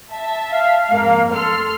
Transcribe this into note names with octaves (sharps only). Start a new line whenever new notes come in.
E5 A5
F5
F2 G#2 A#3
A4 C6 F6